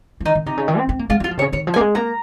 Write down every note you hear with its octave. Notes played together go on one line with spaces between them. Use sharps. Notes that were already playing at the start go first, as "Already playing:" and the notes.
F3
D#3 D#4
D#3
C3 D#4
C#3
D#3
C4
C4
A#3
G#3 F4
F#3 F4
F3
C3 C#5
C#3
D#3 C#5
F3
A#3 G#5
G#3
A#3 A#5